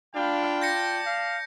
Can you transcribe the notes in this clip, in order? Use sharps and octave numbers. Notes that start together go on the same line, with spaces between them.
D4 F4 F5 G5 B5
D5 A5 G6 A#6 C#7
F5